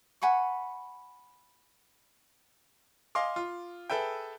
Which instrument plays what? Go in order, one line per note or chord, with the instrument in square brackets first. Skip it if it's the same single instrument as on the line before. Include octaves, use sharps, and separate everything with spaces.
[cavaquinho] F#5 G#5 B5 C#6
[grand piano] D#5 F5 G#5 C6 D6
F4
G#4 A4 B4 E5 G5